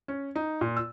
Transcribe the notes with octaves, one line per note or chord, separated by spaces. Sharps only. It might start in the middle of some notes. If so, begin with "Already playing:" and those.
C#4
D#4
A#2
E6